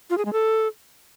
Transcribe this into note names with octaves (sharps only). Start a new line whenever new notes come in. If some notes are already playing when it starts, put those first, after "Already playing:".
F4
G#4
G#3
A4